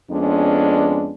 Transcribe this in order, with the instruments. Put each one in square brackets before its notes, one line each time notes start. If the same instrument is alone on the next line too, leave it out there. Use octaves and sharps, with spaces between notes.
[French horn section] F2 G#3 B3 C#4 D4